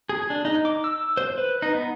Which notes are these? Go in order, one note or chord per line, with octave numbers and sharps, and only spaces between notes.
G#4
D4
D#4
D6
E6
C5
B4
D#4
B3